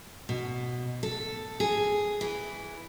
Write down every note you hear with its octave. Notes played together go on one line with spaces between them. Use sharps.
B2
A4
G#4
E3